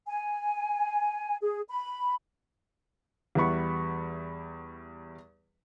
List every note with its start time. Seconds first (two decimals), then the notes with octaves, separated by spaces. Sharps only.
0.07 G#5
1.41 G#4
1.69 B5
3.35 E2 G3 B3 E4 B5 C#6